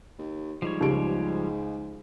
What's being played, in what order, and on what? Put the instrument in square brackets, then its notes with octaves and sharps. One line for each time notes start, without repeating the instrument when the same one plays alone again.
[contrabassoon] D#2
[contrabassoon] G#2 [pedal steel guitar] F3 G3 C#5
[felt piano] C#2 D7 [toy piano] D#4 G4